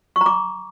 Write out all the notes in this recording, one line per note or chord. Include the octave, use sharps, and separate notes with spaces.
C#6
A#5
D6